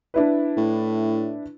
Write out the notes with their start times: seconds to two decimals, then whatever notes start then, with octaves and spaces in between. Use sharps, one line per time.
0.14 D4 E4 B4
0.57 A2